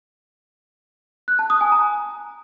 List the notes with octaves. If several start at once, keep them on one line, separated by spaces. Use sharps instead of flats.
F#6
A5
D#6
G#5
A#5